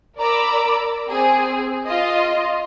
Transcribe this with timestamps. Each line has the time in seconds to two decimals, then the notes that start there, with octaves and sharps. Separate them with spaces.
0.19 A#4 D5 A#5 B5 D6 E6
1.09 C4 G#4
1.87 F4 D#5